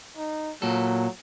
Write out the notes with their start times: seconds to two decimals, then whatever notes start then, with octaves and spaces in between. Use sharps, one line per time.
0.17 D#4
0.62 A#2 F#3 A4